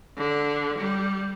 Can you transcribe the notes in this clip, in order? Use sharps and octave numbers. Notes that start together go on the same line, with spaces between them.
D3
G3